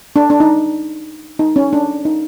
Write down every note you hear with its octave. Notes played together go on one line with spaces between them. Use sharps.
D4
D4
D#4
D#4
C#4
D4
D#4